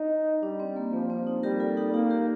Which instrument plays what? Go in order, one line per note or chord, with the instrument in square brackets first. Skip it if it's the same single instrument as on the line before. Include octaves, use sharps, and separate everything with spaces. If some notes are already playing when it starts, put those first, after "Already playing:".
Already playing: [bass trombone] D#4
[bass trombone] G3 [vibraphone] D4
[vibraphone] C4
A#3
[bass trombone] F3 [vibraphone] A#3
[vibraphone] C4
D#4
[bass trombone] G3 [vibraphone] G4 A#4
[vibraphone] F4 A4
D#4 G4
[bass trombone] A#3 [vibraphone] D#4 G4
[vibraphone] G4 A#4